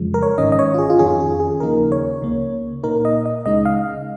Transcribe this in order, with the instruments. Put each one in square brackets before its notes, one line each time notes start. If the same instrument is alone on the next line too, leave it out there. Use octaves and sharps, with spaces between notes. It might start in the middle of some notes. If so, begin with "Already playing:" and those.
Already playing: [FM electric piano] F2 C#3 F3 G#3
A#4
C#5
G#1 G#2 D#3 C#4 D#5
D#5
C#5
F4
G#4
F4
F2 D#3 C#4 G#4
G#4
G#4
D#2 C#3 F3 A#3 D#4 A#4
C#5
C#2 C#3 A#3
A#2 A#3 D#4 A#4
D#5
D#5
C#2 C#3 G#3 D#4 D#5
F5